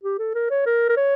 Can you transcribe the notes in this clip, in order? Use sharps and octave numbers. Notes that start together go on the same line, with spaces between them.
G4
A4
A#4
C#5
A#4
A#4
C#5